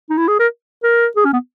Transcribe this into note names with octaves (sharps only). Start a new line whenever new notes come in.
D#4
E4
G#4
A#4
A#4
G#4
C#4
B3